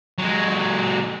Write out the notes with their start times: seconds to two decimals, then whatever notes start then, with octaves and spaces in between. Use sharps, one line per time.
0.18 F#3 G#3